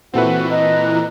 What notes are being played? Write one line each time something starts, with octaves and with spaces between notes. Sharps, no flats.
A#2 E3 C4 F#4 A4 B4 E5 F#5
D#5 A#5 F#6